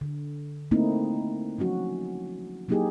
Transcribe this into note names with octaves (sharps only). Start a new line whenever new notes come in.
D3
A3 A#3 C4 D#4 E4
F3 F#3 C#4 F#4
F#3 A#3 D#4 E4 G4 G#4